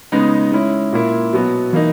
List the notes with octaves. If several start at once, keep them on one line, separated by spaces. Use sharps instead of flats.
C#3 G#3 B3 D#4
G#3 C#4 E4
A#2 A#3 E4
B2 F#3 B3 F#4
E3 A#3 D#4